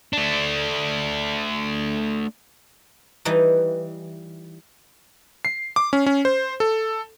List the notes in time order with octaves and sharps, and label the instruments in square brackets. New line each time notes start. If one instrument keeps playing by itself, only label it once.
[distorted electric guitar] A3 D4
[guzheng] E3 G3 D#4
[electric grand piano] C7
D6
C#4
C#4
C5
A4